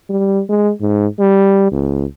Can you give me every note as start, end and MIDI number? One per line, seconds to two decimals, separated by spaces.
0.10 0.41 55
0.49 0.71 56
0.81 1.07 44
1.20 1.71 55
1.72 2.05 37